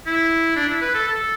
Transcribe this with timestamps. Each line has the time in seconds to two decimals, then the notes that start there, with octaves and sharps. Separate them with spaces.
0.07 E4
0.56 D4
0.69 E4
0.82 B4
0.94 A4
1.08 A4